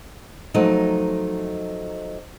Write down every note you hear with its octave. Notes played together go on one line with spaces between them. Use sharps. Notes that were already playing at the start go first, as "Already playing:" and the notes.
F3 F#3 A3 D#4 D#5